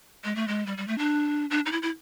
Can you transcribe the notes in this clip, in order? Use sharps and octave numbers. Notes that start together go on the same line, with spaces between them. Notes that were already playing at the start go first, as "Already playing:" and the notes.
G#3
A3
G#3
G3
G3
A3
D4
D4
D#4
E4
E4